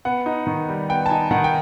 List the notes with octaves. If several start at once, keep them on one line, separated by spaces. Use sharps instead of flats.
B3 F#5
D#4
D#3
G3
B3 G5
A5
D#4 G#5
D#3 F#5
G5